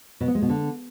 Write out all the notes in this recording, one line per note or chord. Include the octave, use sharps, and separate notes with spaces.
B2
B3
G#3
B2
D3